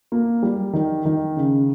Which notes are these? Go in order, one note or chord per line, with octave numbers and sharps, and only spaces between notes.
A#3
G3
D#3
D#3
C#3